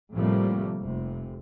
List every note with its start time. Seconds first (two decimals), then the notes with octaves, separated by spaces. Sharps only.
0.13 A2 C3 F3 G3 A3 A#3
0.80 F1 C3